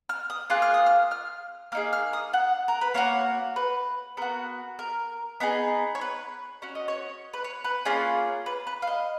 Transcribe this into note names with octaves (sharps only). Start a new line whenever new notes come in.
F6
D#6
A#3 F4 G#4 F#6
F6
D#6
F6
F6
A#3 D#4 G#4 F6
F6
D#6
F#5
A#4
B4
A#3 D#4 F#4 C#5
B4
B3 F#4 A#4
A#4
B3 D#4 G#4
C#5
B4
C#4 F#4 C#5
D#5
C#5
B4
C#5
B4
A#3 C#4 F4 G#4
B4
B4
F5
D#5